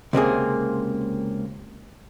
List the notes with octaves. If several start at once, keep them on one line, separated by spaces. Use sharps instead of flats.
C#2 C3 A#3 G#4